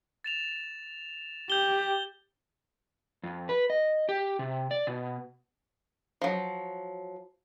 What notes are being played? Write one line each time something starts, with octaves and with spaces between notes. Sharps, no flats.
A6 E7 F7
G4 G6 F7 G7
F2
B4
D#5
G4
C3
D5
B2
F3 F#3